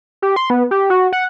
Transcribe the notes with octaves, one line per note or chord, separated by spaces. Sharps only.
G4
C6
B3
G4
F#4
F#5